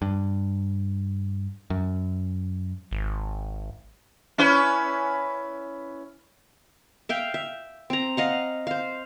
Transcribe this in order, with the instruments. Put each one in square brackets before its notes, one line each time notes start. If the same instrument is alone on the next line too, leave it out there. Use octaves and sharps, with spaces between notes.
[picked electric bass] G2
F#2
[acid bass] G#1
[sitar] C#4 E4 B4
[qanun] E5 F5 G5
E5
C4 A#5
D#5 F5 F#5
C5 F5